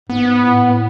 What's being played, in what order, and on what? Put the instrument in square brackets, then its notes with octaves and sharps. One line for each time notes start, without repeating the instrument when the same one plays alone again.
[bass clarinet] G#2 [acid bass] B3
[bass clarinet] A2